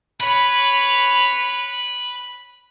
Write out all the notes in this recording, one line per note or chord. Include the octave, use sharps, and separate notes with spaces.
B4 C#5 B5